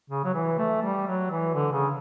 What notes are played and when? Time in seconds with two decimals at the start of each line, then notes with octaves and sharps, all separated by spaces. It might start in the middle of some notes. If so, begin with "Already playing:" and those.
0.10 C#3
0.24 F#3
0.34 E3
0.58 A3
0.82 G3
1.07 F#3
1.31 E3
1.54 D3
1.73 C#3